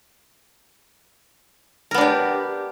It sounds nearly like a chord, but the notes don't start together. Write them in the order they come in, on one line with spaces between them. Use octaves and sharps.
A#4 B3 D4 G4